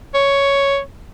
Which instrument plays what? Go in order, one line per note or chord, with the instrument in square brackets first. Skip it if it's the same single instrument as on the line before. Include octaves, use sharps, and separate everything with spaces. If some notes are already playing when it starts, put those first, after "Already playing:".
[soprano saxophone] C#5